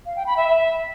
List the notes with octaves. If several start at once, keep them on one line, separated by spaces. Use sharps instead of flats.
F5
G5
B5
E5
E5